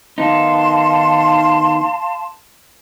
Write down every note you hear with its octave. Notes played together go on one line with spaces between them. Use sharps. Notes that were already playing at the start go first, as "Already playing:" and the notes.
D#3 B3 D#4 F5 A5 C6